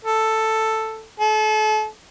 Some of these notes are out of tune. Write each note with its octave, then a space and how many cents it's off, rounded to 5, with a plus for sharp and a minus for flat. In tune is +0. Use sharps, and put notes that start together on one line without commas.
A4 +5
A4 -35